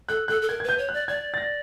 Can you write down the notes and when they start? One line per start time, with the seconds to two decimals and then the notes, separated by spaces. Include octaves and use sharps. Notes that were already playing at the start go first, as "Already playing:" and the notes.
0.09 A4 F#6
0.28 A4 F#6
0.42 A4
0.49 A#4 G#6
0.60 G#6
0.64 B4
0.69 G6
0.78 C#5
0.89 D5 F#6
1.08 D5 G#6
1.34 A6
1.37 A#6